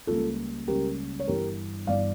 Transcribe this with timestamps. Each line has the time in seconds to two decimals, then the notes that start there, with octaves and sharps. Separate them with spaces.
0.07 C#2 C#3 G3 A#3 C#4 F4 A4
0.67 C#2 C#3 G3 A#3 C#4 G4 A#4
1.20 C#5
1.27 G1 G2 E3 G4 A#4
1.87 G1 G2 E3 D5 F5